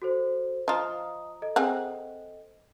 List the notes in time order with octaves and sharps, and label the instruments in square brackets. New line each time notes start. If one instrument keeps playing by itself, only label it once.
[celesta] F#4 A4 C5
[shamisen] F3 F4 [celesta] D#5 A#5 D#6
[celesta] A4 D#5
[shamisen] C4 G#4 F#5